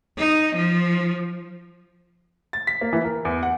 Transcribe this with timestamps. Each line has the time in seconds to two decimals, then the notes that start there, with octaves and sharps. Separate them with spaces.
0.18 D#4
0.55 F3
2.53 A6
2.67 B6
2.81 A#3
2.93 E3
3.05 A#4
3.25 E2
3.43 F#5